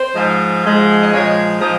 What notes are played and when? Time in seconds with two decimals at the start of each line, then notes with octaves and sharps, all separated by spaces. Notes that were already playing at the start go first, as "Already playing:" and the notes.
Already playing: C5
0.15 G#2 F3 G#3
0.64 G#2 F3 G#3
1.02 D#5
1.12 A#2 F3 G#3 C#5
1.60 A#2 F3 G#3 D#5